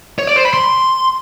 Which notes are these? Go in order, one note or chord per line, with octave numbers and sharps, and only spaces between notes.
C#5
D5
C5
B5
C6